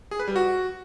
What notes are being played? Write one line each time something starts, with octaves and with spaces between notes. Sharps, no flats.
G#4
B4
G3
F#4